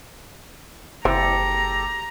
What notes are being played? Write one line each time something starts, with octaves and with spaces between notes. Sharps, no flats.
F#1 E3 C4 G4 A4 A#5